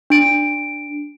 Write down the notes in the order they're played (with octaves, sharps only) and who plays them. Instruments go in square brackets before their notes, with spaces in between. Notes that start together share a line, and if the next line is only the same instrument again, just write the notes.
[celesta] D4 D7